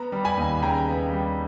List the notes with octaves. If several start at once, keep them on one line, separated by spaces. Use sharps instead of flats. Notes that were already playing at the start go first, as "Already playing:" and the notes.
Already playing: B3 A#5
G3
G#5 B5
D#2
C#3 G5 A#5
B3
G3